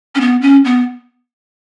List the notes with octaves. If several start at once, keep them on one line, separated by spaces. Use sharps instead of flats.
C#4
B3
C#4
B3